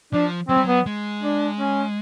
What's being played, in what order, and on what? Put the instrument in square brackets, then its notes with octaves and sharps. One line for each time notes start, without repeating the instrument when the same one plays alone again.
[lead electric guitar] F3 [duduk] D4
[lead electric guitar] F#3 [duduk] C4
[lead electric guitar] G3
[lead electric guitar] F#3 [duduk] B3
[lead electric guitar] G#3
[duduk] D4
C#4